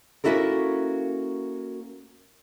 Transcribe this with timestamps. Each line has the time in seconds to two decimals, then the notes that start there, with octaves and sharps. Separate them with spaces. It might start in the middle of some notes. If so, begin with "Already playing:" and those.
0.24 A#3 C#4 E4 F#4 A4 A#4